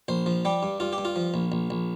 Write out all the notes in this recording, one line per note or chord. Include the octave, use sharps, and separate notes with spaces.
A#1 C5
F3
G3 G4
G2
G2 F4
G4
G2
F4
F3
A#1
A#1
A#1